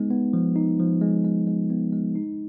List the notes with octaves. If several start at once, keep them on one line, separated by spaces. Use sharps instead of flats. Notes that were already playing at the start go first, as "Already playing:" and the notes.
Already playing: G#3 B3 D#4
B3
F3
D#4
F3
G#3
G#3
G#3
B3
G#3
D#4